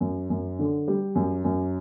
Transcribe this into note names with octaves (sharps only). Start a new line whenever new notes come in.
F#2
F#2
D3
G3
F#2
F#2